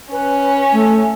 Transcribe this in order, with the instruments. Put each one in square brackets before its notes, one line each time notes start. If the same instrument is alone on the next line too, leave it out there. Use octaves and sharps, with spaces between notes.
[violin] C#4 [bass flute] B4
[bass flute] A3